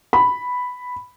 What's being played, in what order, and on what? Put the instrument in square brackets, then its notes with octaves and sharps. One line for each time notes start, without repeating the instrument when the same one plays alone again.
[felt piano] B5